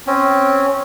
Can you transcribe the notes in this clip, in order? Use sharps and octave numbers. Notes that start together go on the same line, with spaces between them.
C4 C#4